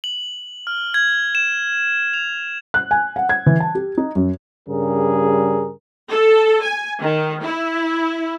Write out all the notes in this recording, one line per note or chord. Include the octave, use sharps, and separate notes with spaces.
F#7
F6
G#6
E7
F7
F#6
G#5
F#5
G#6
E3
A5
G4
D#4
F#2
G2 C#3 G3 G#4 A#4
A4
G#5
D#3
E4